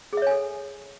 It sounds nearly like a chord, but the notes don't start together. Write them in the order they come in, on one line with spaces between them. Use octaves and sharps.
G#4 E5 C#5 G#5 A4